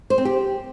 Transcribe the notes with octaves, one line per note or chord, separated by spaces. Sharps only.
C5
C4
G4